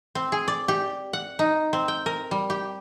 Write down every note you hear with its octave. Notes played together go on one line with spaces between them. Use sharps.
C4
G#4
D5
G4
F#5
D#4
C4
G5
A#4
G3
G4